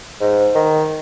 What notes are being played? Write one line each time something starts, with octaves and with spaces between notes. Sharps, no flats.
G#2
D#3